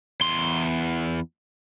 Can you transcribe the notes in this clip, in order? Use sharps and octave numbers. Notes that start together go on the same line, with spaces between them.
E2 C6